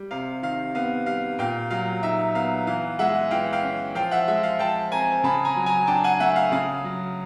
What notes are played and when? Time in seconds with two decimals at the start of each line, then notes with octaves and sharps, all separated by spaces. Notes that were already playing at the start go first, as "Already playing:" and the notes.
Already playing: G3
0.11 C3 F5
0.43 D#3 F5
0.75 B3 F5
1.06 G3 F5
1.39 A#2 F5 G5
1.70 F#3 F5
2.03 D#4 E5
2.35 B3 F5
2.67 E3 F5
2.99 G#3 E5 F#5
3.31 E3 F5 G5
3.53 F5 G5
3.63 C#4
3.95 F3 F5 G5
4.11 E5 F#5
4.28 G#3 E5
4.43 F5
4.59 F3 G5 A5
4.92 C4 G#5 A#5
5.24 C#3 A5 B5
5.45 G#5 A#5
5.56 F#3
5.66 G#5 A#5
5.87 D4 G5 A5
6.04 F#5 G#5
6.20 A3 E5 F#5
6.36 F5
6.52 C#3 F5
6.84 F#3